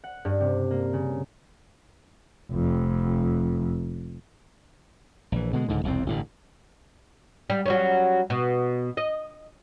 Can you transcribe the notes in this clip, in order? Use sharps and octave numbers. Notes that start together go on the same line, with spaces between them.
F#5
G2
C3
A#3
C#3
F1 F2
A#1 E3
B2 D3 G#3
C#2 G#2 D3
E1 C2 F2 C4
A1 G2 D3
G3
F#3 G3 C#4
B2
D#5